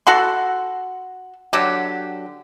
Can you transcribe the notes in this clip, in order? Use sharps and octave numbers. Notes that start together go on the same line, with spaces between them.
F#4 A4 F#5 C6
D3 F#3 G4